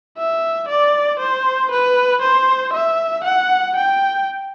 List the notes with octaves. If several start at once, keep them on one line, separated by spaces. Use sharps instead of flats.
E5
D5
C5
B4
C5
E5
F#5
G5